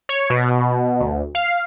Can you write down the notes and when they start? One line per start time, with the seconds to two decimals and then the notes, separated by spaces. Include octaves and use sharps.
0.09 C#5
0.30 B2
1.00 D2
1.35 F5